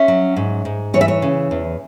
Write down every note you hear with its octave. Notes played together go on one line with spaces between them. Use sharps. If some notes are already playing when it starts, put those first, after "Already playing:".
Already playing: C#4 E5
F#3
G#2
G#2
E3 C#5
E5
C#5
C#3
E2